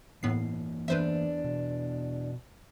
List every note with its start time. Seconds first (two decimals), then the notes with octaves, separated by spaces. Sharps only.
0.23 A2 E3 A#3 B3 C7
0.88 E2 D4 B4 C5 E5
1.44 B2